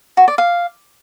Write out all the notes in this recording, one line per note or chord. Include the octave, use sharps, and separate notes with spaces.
F#4
D5
F5